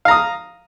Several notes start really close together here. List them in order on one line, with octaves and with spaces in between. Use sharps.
F5 A#5 D#6